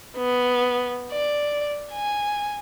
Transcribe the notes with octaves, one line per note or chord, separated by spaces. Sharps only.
B3
D5
G#5